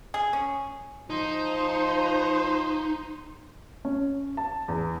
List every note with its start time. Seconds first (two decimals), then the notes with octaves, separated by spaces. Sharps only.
0.14 G#4
0.33 C#4
1.10 F3 D#4 C5
3.85 C#4
4.37 A5
4.68 E2